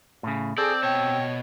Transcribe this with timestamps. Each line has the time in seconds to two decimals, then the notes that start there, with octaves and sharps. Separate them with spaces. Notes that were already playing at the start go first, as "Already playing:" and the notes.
0.23 A2 C#3
0.58 C4 G#4 A4 D5
0.83 B2 C#5 G5 A5